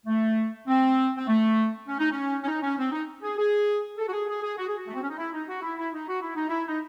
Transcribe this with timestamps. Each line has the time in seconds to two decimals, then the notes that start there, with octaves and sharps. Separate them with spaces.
0.07 A3
0.68 C4
1.17 C4
1.28 A3
1.87 C#4
1.99 D#4
2.10 C#4
2.44 C#4
2.47 D#4
2.62 C#4
2.78 C4
2.92 D#4
3.22 G#4
3.37 G#4
3.98 A4
4.07 F#4
4.12 G#4
4.27 G#4
4.42 G#4
4.57 F#4
4.67 G#4
4.77 F#4
4.87 A3
4.94 C4
5.01 C#4
5.09 D#4
5.17 E4
5.33 D#4
5.48 F#4
5.62 E4
5.78 E4
5.93 D#4
6.08 F#4
6.21 E4
6.35 D#4
6.48 E4
6.68 D#4